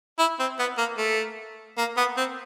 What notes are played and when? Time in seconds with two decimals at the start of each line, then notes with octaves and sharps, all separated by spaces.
0.19 E4
0.39 C4
0.59 B3
0.78 A#3
0.98 A3
1.78 A#3
1.97 B3
2.17 C4